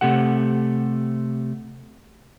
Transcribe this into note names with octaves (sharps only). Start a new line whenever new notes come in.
C3 A3 G4 F#5